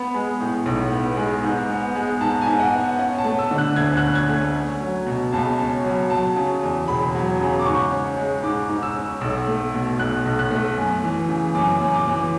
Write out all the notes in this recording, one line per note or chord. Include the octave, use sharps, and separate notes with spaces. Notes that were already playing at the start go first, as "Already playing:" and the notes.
Already playing: B3 B5
G#3
A2
B1
B3
G#3
G#2
B3
G#3
G#2 A5
G#5
G#2
F#5
B3
C#4 F#5
A5
A3
E6
D3
F#6
D2 G#6
F#6
C#4
G#6
A3
C#4
F#3
B2
C#2 A5
C#4
F#3
F#3 A5
C#3
E2
E1 B5
F#3
C#3
D6
G#2 C#6
C#4
G#3
G#2 D6
G#2
E6
C#4
B1 E6
A3
B2
B1 F#6
B1
F#6
A3
F#2
E3
C#3
F#2 D6
F#2
D6
E3